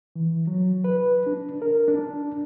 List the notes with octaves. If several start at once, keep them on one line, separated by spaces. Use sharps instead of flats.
E3
F#3
B4
D4
A#4
D4